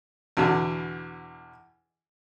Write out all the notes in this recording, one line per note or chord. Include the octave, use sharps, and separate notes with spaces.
E2 B2 D3